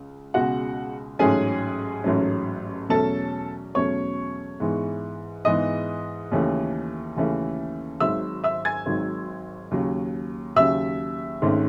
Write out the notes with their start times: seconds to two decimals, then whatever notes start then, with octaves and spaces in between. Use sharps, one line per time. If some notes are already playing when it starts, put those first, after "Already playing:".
Already playing: C#2
0.34 C#2 B2 G#3 F#4 F#5
1.19 A1 G#2 F#3 A3 C#4 G#4 G#5
2.04 A1 G#2 F#3 A3 C#4
2.89 E2 B2 F#3 A3 C#4 A4 A5
3.75 E2 B2 F#3 A3 C#4 C#5 C#6
4.60 G#2 E3 G#3 B3
5.45 G#2 E3 G#3 B3 D#5 D#6
6.31 D#2 C#3 E3 A3 C#4
7.16 D#2 C#3 E3 A3 C#4
8.00 G#1 G#2 D#3 F#3 E5 E6
8.44 E5 E6
8.65 G#5 G#6
8.86 G#1 G#2 D#3 F#3
9.71 D#2 C#3 F#3
10.56 D#2 C#3 F#3 E5 E6
11.42 G#1 G#2 D#3 A3 C#4